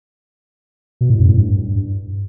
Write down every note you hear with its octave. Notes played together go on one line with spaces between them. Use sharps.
B2
A2
F#2
A2
G2